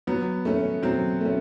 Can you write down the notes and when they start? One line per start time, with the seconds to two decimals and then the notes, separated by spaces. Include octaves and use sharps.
0.07 F#3 B3
0.45 A3 C#4
0.82 F#3 C4
1.21 A3 C#4